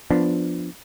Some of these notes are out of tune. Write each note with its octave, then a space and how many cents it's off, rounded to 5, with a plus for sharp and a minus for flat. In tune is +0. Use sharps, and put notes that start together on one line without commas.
F3 +0 B3 +0 D4 +0